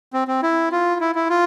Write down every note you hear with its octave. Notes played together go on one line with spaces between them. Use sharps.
C4
C4
E4
F4
E4
E4
F4